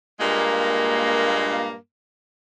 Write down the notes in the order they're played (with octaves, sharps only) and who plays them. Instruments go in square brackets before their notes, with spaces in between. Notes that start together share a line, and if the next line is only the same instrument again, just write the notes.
[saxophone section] G2 A#2 G#3 A#3